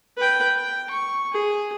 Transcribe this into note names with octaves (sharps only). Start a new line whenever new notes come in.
B4 G5
G5
C#6
G#4